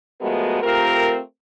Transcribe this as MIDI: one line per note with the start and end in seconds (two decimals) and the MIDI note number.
0.21 0.60 53
0.21 0.60 56
0.21 0.60 57
0.21 0.60 59
0.21 0.60 66
0.21 0.60 70
0.62 1.18 57
0.62 1.18 60
0.62 1.18 65
0.62 1.18 67
0.62 1.18 70